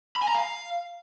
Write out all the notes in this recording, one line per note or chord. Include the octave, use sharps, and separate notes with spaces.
B5
G#5
A#5
F5